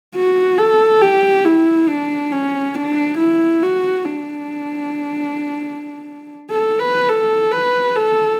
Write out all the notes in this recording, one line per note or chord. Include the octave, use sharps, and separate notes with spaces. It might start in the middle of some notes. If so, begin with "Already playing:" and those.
F#4
A4
G4
E4
D4
C#4
D4
E4
F#4
D4
A4
B4
A4
B4
A4